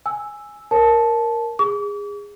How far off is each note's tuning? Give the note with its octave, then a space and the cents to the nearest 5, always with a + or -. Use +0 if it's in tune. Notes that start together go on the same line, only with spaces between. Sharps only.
G#5 +0 E6 +0
A#4 +0 C#5 -40 A5 -15
G#4 -25 D6 -40